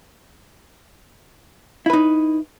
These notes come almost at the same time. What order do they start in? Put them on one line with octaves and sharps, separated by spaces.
E4 B4 D#4